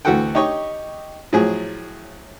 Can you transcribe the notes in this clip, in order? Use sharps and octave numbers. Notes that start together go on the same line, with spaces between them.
D2 E3 F#4 A4 F#5 G5
D#4 G4 C#5 D#5 C#6
A2 F3 F#3 G#4